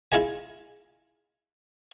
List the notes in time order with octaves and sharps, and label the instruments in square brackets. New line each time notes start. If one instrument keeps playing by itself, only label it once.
[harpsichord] E4 F4 G#4 D#5 G#5